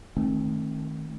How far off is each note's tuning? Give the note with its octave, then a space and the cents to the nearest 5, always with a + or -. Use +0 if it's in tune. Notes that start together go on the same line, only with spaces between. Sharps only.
D#3 +0 A3 -20 C4 +35